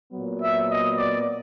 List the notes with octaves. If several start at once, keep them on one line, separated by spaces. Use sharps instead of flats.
A#2 F#3 B3
E5
D#5
D5